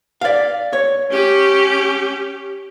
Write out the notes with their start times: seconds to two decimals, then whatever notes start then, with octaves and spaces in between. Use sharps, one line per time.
0.21 D5 F5
0.73 C#5
1.11 C#4 G4